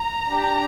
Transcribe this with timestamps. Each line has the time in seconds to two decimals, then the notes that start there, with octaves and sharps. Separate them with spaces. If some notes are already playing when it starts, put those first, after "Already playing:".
Already playing: A#5
0.31 D4 G4